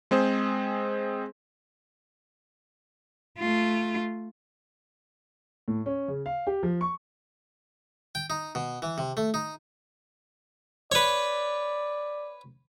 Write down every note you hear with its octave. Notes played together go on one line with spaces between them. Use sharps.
G#3 C4 G#4 C5
A3 F4
A2
C#4
C#3
F5
G4
F3
C#6
G5
D#4
B2
E3
C3
A3
D#4
B4 C#5 D5